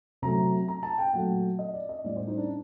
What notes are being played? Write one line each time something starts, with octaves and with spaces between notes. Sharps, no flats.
C3 F#3 A3 A#5
A#5
A5
G5
A#2 F#3 A3 F#5
D#5
D5
D#5
A2 G3 D5
C5
D#4
D4